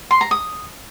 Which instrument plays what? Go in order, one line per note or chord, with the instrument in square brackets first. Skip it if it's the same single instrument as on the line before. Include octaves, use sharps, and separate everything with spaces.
[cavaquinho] C6
A#5
D#6